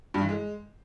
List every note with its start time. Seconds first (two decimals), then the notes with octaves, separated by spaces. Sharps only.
0.14 G2
0.22 E3
0.29 G#3